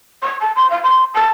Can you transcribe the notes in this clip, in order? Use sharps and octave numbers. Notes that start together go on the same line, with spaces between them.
C#6
A5
C6
F5
C6
A5